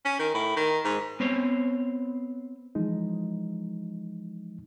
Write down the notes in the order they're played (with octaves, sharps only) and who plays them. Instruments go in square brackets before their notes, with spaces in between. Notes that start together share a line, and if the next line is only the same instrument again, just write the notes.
[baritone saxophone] C#4
D#3
A2
D#3
G#2
[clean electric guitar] B3 C4 C5 C#5
[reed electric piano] E3 F3 G#3 D#4